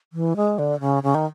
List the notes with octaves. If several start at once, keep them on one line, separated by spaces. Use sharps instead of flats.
E3
G#3
D3
C#3
C#3
D#3